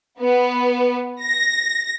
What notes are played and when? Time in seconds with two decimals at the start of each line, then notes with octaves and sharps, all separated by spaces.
0.19 B3
1.23 A#6